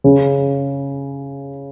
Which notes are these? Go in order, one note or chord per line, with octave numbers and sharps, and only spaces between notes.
C#3